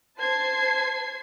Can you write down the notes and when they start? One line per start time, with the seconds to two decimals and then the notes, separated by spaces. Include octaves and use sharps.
0.20 C5 A5 G#6 C7